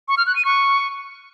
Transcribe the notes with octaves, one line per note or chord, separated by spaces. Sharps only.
C#6
F6
F#6
D#7
C#6